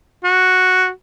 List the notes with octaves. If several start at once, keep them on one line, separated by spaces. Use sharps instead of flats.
F#4